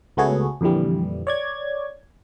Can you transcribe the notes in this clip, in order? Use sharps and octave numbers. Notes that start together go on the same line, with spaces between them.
C#2 A3 B3 F#4 G#4 C#5
F2 A#2 D3 E3 G3
C#5 D5 G#6